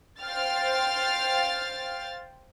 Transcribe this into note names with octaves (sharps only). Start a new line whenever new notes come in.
C5 F5 G5 F6 A6